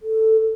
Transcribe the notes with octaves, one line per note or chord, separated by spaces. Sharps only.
A4